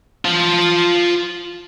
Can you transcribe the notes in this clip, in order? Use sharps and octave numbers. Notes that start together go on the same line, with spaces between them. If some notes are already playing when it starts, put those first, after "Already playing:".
F4 A5